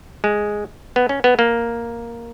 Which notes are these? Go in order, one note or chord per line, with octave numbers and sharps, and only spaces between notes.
G#3
B3
C#4
B3
A#3